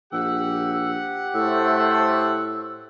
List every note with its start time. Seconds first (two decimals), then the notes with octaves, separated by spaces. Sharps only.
0.12 A#1 G4 F#5 E6
1.34 A2 A3 C5 E6